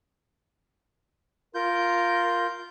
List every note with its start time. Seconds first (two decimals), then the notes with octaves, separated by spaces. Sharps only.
1.55 F4 A#4 G6